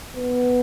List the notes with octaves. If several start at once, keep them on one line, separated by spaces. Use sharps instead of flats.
B3